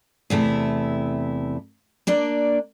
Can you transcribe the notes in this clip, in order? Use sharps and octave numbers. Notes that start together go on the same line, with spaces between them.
E2 C3 A3 E4
A#3 D4 D5